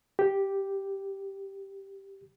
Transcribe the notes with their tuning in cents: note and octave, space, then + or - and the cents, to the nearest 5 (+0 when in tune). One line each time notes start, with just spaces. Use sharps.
G4 -5